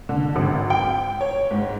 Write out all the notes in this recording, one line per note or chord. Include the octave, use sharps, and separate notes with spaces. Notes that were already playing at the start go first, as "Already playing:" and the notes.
D3
G#1
G5
C#5
G#2